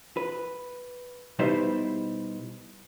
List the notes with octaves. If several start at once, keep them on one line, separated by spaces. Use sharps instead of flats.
B4
B2 G3 D#4 E4 B4 C5